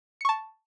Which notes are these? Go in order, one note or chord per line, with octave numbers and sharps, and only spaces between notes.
A5 C#6 C#7